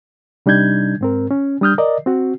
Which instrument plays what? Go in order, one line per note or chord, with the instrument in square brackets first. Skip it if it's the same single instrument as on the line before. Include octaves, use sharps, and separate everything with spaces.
[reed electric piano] C3 G3 D4 D#4 G6 G#6
G#2 C4 A#4
C#4
G3 D4 D#6 F6 G6
A#4 D5 D#5
C4 F#4